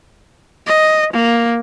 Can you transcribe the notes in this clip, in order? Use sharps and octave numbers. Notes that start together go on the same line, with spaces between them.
D#5
A#3